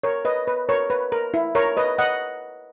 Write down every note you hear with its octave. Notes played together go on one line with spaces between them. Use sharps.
A#4 C#5
B4 D#5
B4
A#4 C#5
B4
A#4
E4
A#4 C#5
B4 D#5
D#5 F#5